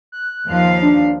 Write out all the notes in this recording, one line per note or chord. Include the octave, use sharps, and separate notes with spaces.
F#6
D#2 F3 F5
D4